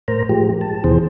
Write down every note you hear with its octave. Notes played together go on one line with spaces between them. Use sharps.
A2 A#4 C5 A#5
A2 F3 G#3 G4
A5
D#2 B2 E3 G#4 C5